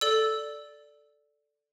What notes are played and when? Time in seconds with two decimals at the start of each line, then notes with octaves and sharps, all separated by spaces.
0.01 A4 D5 E6